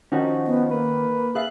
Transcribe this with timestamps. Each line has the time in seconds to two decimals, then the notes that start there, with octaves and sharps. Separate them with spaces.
0.12 D#3 F3 C#4 D#4 F#4
0.47 B3
0.71 A#3 B4
1.35 G#4 E5 F5 F#6